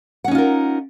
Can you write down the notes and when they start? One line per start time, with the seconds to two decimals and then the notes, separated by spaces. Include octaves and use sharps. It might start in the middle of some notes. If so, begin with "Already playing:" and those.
0.24 F#5
0.28 C#4
0.31 D#4
0.35 F4
0.38 A#4